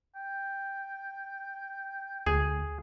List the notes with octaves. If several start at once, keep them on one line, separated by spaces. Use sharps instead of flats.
G5
D2 G#4